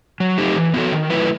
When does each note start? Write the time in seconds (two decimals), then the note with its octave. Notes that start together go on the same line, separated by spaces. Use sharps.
0.20 F#3
0.38 A3 D#4 G4
0.56 E3
0.74 B3 F#4 A4
0.92 D#3
1.10 F#3 A3 E4 B4